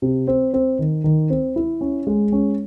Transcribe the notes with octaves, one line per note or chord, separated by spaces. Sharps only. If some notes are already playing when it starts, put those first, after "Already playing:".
C3
C4
C4
D#3
D#3
C4
E4
C#4
G#3
C#4